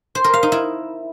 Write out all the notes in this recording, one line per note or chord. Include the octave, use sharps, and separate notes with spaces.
C5
A#4
F5
D#4
E4